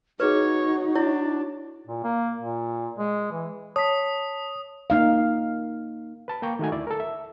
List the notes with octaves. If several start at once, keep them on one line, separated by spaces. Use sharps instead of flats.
D#4 F#4 G#4 B4 C#5
D4 E4 C#5
A#2
A#3
A#2
G#3
E3
C#5 A5 D#6 B6
A#3 D#4 F5
B4 A5 B5
A#3 G5 A#5 C#6
D#3 A3 F#4 G#5
D2 E4 D5
A4 A#4
E5